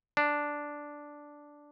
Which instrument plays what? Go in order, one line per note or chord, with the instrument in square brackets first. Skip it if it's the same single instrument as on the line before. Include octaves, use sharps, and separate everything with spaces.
[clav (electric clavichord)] D4